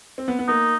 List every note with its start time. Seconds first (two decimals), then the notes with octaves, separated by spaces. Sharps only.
0.18 C4
0.28 B3
0.39 B3
0.48 A#3 D#4